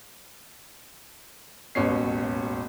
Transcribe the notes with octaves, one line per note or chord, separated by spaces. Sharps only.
E1 A1 D#2 B2 C#4 C7